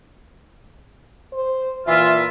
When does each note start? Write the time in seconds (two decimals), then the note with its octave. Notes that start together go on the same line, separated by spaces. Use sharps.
1.33 C5
1.87 A#2 E3 F4 E5